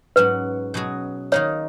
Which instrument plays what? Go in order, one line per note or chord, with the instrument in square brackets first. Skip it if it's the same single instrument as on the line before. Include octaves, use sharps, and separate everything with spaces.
[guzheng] G#2 F#3 C#4 F#4 [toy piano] B4
[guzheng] B2 F#3 C#4 G#4
[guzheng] D#3 A#3 D#4 A#4 [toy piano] C#5